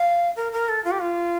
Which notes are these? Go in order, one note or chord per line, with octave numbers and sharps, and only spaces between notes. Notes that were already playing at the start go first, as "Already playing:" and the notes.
Already playing: F5
A#4
A#4
A4
F4
G4
F4